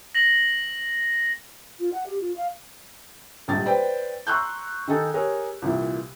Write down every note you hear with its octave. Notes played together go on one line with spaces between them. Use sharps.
A#6 F#7
F4
F#5
G4
F4
F5
D#1 A#1 G#2 G3 D#4 A6
B4 C5 D5 G5
A#5 C6 C#6 E6 F#6 G6
D#3 D#4 G#4 A4
G4 G#4 A#4 C#5
C2 A#2 E3